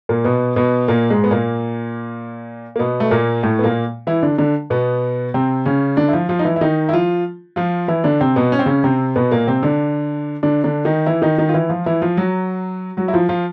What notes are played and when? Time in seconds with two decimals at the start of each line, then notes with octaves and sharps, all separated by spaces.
0.09 A#2 A#3
0.24 B2 B3
0.56 B2 B3
0.88 A#2 A#3
1.10 G#2 G#3
1.24 B3
1.31 A#2 A#3
2.76 A#3
2.79 B2 B3
3.00 A3
3.11 A#2 A#3
3.43 A2 A3
3.59 B3
3.64 A#2 A#3
4.07 E3 E4
4.23 D3 D4
4.38 D3 D4
4.70 B2 B3
5.34 C3 C4
5.65 C#3 C#4
5.97 D3 D4
6.08 E4
6.13 F3 F4
6.29 F3 F4
6.39 D#4
6.45 E3 E4
6.56 E4
6.61 D#3 D#4
6.89 E4
6.93 F3 F4
7.56 F3 F4
7.88 E3 E4
8.04 D3 D4
8.21 C3 C4
8.36 B2 B3
8.52 C#4
8.59 C4
8.66 C#3 C#4
8.84 C3 C4
9.16 B2 B3
9.31 A#2 A#3
9.47 C3 C4
9.63 D3 D4
10.43 D3 D4
10.64 D3 D4
10.85 D#3 D#4
11.06 E3 E4
11.22 D#3 D#4
11.38 D#3 D#4
11.49 F4
11.54 E3 E4
11.69 F3 F4
11.86 E3 E4
12.02 F3 F4
12.17 F#3 F#4
12.97 F#3 F#4
13.08 E4
13.13 F3 F4
13.29 F3 F4